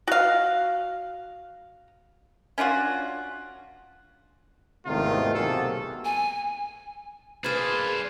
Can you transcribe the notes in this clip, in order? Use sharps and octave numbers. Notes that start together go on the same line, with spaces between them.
F#4 F5
C#4 D4 F4 F#4
G#1 E2 C3 D#3 A3 F4
B1 C3 A#3 F#4 G#4 A4
G#5
A#3 D4 G#4 B4 C5 F6 G#6 A6